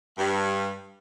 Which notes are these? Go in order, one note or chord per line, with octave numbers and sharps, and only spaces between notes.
G2